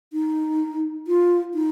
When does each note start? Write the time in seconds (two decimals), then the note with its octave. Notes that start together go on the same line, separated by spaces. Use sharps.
0.13 D#4
1.07 F4
1.54 D#4